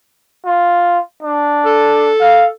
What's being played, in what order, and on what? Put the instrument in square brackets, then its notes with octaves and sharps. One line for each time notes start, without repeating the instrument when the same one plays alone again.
[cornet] F4
D4
[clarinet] A4
[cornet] F5